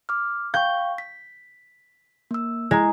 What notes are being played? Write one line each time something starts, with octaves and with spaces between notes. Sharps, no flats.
D6 F6
F5 G5 C#6 G6
B6
A#3 E6
G#3 E4 A#5